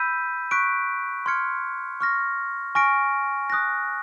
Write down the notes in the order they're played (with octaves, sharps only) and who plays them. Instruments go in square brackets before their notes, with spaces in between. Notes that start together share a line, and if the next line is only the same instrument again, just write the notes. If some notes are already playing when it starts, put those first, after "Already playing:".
Already playing: [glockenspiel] B5 E6 G6 B6 D#7
C#6 F#6 B6 D7
C6 F6 G#6 C#7
C#6 F6 A#6
G#5 C#6 F6 A#6 D7
D#6 F#6 A#6